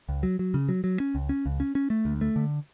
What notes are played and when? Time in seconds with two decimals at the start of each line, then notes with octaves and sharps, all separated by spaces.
0.09 C#2
0.23 F#3
0.39 F#3
0.54 C#3
0.69 F#3
0.84 F#3
1.00 C#4
1.15 C#2
1.29 C#4
1.46 C#2
1.60 C#4
1.75 C#4
1.90 A3
2.05 D2
2.21 A3
2.36 D3